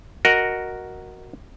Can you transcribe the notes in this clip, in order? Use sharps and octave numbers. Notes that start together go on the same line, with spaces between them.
F#4 A#4 D#5 F#5